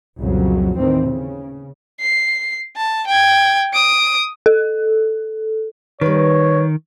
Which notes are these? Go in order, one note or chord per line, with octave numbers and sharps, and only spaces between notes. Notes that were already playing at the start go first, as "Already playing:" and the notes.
C2 F2 A#2 C#3 F#3
D#2 A2 D#3 E3 C4
C#3
C7
A5
G5 G#6
D#6 D7
A4
D#3 G3 B4 C#5